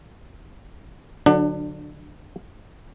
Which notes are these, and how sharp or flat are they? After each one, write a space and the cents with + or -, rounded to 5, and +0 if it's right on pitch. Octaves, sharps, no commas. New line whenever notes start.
D3 +0 F#3 -15 D4 +30